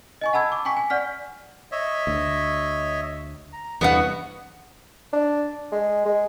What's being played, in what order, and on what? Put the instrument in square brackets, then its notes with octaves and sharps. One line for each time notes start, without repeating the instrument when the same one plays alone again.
[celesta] D#5 G#5 C#6
F#5 A5 B5 E6 G#6
D6
G5 G#5 C#6 B6
G#5
D5 F#5 F6 B6
[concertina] C#5 D#5 E5
[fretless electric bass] D2
[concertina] A#5
[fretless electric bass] E2 G2 C3 [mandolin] B3 D4 F#4 [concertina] D#5 F#5
[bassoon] D4
G#3
G#3